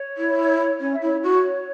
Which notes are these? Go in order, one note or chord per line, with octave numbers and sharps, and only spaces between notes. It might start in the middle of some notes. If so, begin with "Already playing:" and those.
Already playing: C#5
E4
C#4 C#5
E5
E4 C#5
F#4